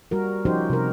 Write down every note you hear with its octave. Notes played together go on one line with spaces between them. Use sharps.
G3 F#4 A#4
F3 C#4 D#4 F#4 G4 C5
C3 A#4